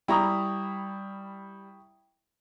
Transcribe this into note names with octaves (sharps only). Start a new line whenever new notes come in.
G3 E4 G5 A#5 C#6 D#6